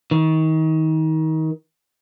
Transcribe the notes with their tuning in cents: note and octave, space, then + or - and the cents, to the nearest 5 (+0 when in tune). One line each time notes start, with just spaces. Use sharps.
D#3 +30